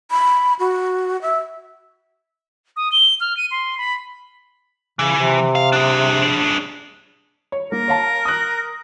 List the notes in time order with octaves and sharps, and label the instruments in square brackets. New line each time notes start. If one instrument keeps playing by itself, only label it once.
[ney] B5
F#4
E5
[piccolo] D#6
G7
F6
D#7
C6
B5
[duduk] C#3 [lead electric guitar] E3
[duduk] C3
[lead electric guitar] F5
D4 G#4
[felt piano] C#5
[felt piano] A#3 [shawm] A#4
[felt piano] C#5 F5 A5
D#6 F#6